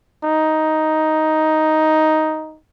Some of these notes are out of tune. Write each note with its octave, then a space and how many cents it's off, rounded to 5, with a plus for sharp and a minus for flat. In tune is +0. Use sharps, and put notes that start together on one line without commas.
D#4 +5